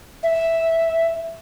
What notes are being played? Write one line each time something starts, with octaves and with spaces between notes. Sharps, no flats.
E5